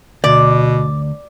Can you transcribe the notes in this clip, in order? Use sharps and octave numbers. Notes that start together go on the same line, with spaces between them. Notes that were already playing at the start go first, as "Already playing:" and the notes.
D2 B2 D5